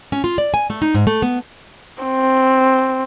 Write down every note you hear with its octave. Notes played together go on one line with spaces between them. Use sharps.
C#4
F4
D5
G#5
A3
D#4
G#2
A3
B3
C4